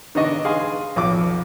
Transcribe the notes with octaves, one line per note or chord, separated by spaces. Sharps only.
D#3 B3 D4 D#5 C#6
G#4 F5 G#5 C6
B1 F2 D6